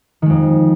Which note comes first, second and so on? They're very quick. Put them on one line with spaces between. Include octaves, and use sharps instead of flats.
D#3 G#3 F2